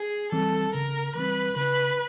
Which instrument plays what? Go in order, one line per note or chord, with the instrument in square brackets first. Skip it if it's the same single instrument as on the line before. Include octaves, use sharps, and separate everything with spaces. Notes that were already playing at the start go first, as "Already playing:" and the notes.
Already playing: [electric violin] G#4
[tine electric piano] E3 G3 C4 [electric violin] A4
[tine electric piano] C#3 [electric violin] A#4
[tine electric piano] E3 G3 C4 [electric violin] B4
[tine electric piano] C#3 [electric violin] B4